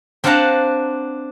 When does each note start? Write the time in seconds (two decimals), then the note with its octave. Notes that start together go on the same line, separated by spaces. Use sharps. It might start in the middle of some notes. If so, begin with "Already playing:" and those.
0.24 C4 D4 F5 F#5 A5 A#5